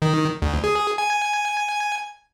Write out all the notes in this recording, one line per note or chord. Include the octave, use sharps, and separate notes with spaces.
D#3
D2
G#4
G#5